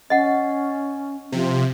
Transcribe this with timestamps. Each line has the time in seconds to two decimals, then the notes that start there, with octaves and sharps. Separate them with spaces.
0.10 C#4 D#5 F#5
1.32 C3 F3